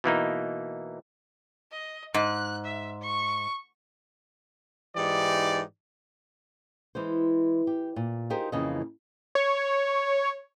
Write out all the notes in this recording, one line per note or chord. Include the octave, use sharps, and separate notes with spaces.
B2 E3 A#3 D#4
D#5
G#2 F#6
E5
C#6
G#2 E3 D#4 G4 D5
E3 G#3 C5
G4
A#2
D#4 F4 G4 G#4 A#4 C5
F2 C#3 E3 A#3 D#5
C#5